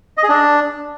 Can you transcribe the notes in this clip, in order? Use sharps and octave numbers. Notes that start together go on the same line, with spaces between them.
D#5
G#4
D4